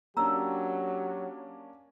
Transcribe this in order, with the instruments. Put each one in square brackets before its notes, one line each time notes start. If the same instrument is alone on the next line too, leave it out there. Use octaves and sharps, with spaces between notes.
[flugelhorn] F#3 [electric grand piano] A#3 C#4 D4 [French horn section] G4 [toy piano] A#5 E6